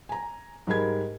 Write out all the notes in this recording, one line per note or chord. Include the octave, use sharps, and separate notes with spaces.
G#5 A#5
G#2 G3 G#3 A#4 B5 G#6